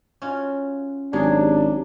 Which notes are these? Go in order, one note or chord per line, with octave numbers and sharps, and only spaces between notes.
C#4 F4 F#4
G#1 F#3 D4 G4 G#4